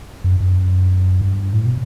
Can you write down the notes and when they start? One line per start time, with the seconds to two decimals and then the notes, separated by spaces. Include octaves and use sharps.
0.24 F#2
0.40 F#2
1.21 G2
1.53 A2
1.66 B2